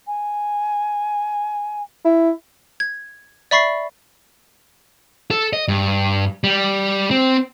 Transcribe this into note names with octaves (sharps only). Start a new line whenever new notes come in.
G#5
E4
G#6
D5 E5 B5 C#6 A6 C7
A4
D#5
G2
G3
C4